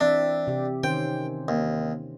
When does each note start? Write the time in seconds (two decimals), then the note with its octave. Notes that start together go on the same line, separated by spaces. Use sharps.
0.01 E3 C4 D4 E5
0.47 C3 G4
0.84 D#3 C#4 C5 G5
1.48 D#2